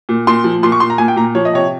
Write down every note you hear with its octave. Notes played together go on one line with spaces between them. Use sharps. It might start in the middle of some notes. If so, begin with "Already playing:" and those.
A#2
A#2 C6
F3
A#2 C6
C#6
A#2 C6
A#5
A#2 G#5
G5
A#2 A#5
F3 C#5
D#5
C3 C#5